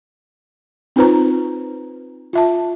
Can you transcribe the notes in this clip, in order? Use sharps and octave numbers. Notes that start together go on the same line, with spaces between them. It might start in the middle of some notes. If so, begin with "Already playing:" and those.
C4 D#4 F4 B4 C5 A#5
F4 E5 A5